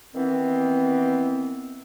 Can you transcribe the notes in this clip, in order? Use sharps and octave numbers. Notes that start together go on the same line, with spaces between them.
D#3 E3 B3 C4